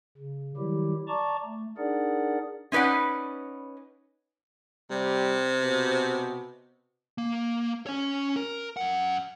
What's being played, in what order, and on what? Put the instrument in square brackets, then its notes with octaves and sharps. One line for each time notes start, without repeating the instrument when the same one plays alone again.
[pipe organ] C#3
D#3 F#3 G3 E4 G4
D5 A5 A#5 C#6 D6
A3
D4 D#4 G#4 A#4 D5 F#5
[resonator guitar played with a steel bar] C#4 D#4 B4 D5 F#5
[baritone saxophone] C3 [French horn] G3
[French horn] B2
[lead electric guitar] A#3
C#4 C#5
A#4
F#2 F#5